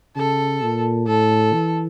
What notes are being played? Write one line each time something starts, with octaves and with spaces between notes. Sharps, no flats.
C#3 A4
A#2
A2 A4
E3